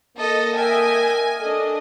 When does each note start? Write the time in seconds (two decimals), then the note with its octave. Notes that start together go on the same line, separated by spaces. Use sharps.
0.17 A#3 A4 D#5
0.57 A#4 D#5 E5 G5 G#5
1.42 D4 A4 D#5